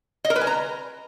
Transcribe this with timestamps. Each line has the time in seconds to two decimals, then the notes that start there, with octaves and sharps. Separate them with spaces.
0.25 D#5
0.30 A#4
0.36 B4
0.41 G#5
0.47 A#5